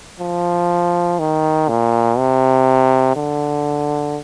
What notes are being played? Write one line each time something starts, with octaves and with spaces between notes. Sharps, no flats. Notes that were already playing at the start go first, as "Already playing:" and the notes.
F3
D#3
A#2
C3
D3